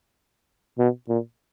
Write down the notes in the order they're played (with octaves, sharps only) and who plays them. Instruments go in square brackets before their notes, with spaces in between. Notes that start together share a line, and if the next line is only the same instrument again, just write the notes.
[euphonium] B2
A#2